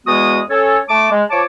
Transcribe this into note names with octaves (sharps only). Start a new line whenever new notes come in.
E2 G#3 B3 F#4 D#6
C#4 A4 C#5
A3 A5 D6
G#3
F3 C#5 A5 D6